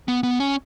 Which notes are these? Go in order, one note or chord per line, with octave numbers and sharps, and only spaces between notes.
B3
B3
C#4